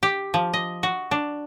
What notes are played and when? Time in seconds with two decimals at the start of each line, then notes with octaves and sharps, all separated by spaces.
0.03 G4
0.34 F3
0.53 D#5
0.83 F#4
1.11 D4